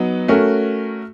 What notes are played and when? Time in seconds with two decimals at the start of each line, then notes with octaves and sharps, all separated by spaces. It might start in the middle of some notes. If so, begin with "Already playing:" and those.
Already playing: F#3 B3 D#4
0.28 A3 C#4 F#4 A#4